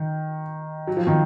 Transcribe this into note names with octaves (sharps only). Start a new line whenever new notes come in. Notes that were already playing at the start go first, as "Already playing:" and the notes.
Already playing: D#3
F#3
F3
D#3